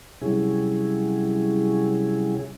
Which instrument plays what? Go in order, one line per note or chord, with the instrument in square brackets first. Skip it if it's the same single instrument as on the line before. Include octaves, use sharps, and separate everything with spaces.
[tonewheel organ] C3 F#3 G3 C#4 E4 G#4